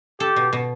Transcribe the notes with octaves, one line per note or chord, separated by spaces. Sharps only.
G4 A4
B2
B2